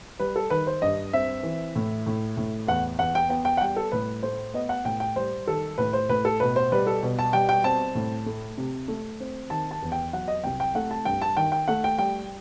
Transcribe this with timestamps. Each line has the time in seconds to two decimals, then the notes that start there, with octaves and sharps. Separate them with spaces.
0.19 G3 B4
0.36 A4
0.50 D#3 B4
0.67 C5
0.82 G2 D#5
1.13 C4 E5
1.43 E3
1.75 A2
2.06 A2
2.37 A2
2.67 E2 F#5
2.99 E2 F#5
3.15 G5
3.29 B3 G5
3.45 G5
3.57 F#5
3.61 G3 G5
3.76 A4
3.92 A2 B4
4.23 A3 C5
4.54 B3 D#5
4.69 F#5
4.85 A2 G5
5.00 G5
5.16 G3 C5
5.47 D#3 A4
5.78 A2 B4
5.93 C5
6.09 A2 B4
6.25 A4
6.40 B2 B4
6.56 C5
6.72 G3 B4
6.87 A4
7.03 B2
7.19 A5
7.33 G3 G5
7.49 G5
7.64 C4 A5
7.95 A2
8.26 A3
8.57 C3
8.88 A3
9.20 C4
9.50 D#3 A5
9.71 A5
9.82 E2
9.92 G5
10.13 F#3 F#5
10.28 D#5
10.44 C2 G5
10.60 G5
10.75 A3 F#5
10.91 A5
11.05 G2 G5
11.22 A5
11.37 D#3 G5
11.52 G5
11.68 A3 F#5
11.84 G5
11.98 G3 G5